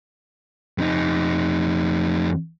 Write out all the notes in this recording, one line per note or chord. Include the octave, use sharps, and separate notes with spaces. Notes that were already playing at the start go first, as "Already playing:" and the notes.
F2 D#4